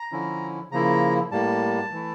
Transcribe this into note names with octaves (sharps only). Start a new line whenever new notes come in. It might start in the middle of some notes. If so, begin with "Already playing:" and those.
Already playing: A#5
D3 F3 C#4 E4
C#3 F3 A#3 E4 A#5
A2 G3 A#3 A5
E3 A3 E4